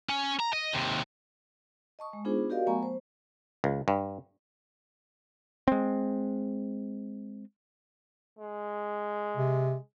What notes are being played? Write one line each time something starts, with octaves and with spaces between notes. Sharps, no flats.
C#4
A#5
D#5
D#2 C3
D#5 A5 C#6 D#6
G#3
B3 D4 D#4 F4 G#4 C5
F#4 G4 A#4 D5 D#5 F5
F#3 A3 B3 G#5 A#5 C#6
C5
C#2
G2
G#3 C4
G#3
C3